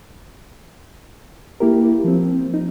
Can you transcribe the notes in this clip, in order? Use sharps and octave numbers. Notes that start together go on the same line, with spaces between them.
A#3 E4 G4 A#4
F3 C4
D#4